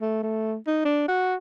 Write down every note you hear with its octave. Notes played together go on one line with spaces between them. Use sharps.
A3
A3
D#4
D4
F#4